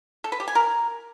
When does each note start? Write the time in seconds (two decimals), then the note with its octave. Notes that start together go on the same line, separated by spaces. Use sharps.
0.24 A4
0.32 B4
0.40 G4
0.48 G#5
0.55 A#4